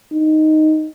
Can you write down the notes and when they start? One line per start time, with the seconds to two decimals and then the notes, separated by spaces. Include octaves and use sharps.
0.13 D#4